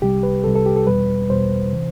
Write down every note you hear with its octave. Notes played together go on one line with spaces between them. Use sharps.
C2 C3 G3 G4
B4
C2 C3 G3 A4
A4
G4
A4
E2 B2 G3 B4
E2 B2 G3 C5
C3 E3